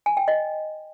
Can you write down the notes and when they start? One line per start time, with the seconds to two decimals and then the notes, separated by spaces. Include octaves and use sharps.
0.06 G#5
0.17 G5
0.28 D#5